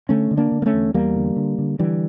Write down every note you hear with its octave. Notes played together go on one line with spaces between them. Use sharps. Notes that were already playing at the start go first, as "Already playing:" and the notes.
D3 A3 C#4
D3
A#3 D4
D3
A#3
A3 C#4
E2
E2 G3 A#3
D3
D3
D3
D3 E3 G3